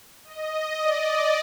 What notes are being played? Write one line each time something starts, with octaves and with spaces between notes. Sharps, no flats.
D#5
D5